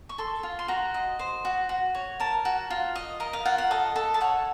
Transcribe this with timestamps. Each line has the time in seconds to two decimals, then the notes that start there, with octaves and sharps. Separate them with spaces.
0.09 C#6
0.18 A4 C6
0.43 F4
0.59 C6
0.68 F#4 A#5
0.94 D#5
1.19 C5
1.45 F#4
1.69 F#4
1.95 C#5
2.20 A#4 A5
2.45 F#4
2.70 F4
2.95 D#5
3.20 A#4 D#5
3.33 F5
3.45 F4 F#5
3.58 F#5
3.71 A4 D#5
3.96 A4
4.14 A5
4.21 C#5 F#5